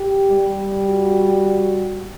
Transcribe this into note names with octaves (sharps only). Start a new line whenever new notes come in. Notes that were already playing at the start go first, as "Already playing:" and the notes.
Already playing: G4
G3
F#4